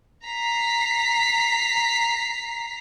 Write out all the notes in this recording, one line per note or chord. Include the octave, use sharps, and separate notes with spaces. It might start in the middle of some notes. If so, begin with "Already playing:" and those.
A#5 B6 C7